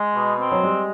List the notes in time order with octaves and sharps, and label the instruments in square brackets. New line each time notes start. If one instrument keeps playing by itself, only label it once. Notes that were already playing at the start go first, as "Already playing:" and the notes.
Already playing: [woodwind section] G#3
B2
C4
[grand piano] F#3
[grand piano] G3 [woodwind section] G#3